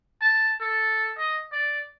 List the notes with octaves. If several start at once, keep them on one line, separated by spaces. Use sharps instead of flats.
A5
A4
D#5
D5